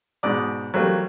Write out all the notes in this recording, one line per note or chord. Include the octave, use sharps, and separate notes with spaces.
G#2 B2 D5 D#6
F#3 G3 A3 A#3 C4 F4